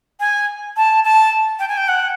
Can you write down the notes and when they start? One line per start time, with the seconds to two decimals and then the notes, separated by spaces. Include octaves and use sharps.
0.20 G#5
0.77 A5
1.04 A5
1.59 G5
1.69 G#5
1.77 G5
1.88 F#5